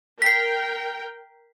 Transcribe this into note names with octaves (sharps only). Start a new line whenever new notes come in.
A#4 G5 B6 C7